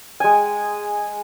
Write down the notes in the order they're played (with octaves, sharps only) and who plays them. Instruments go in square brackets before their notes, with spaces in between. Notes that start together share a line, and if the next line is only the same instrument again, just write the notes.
[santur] G#3 G#5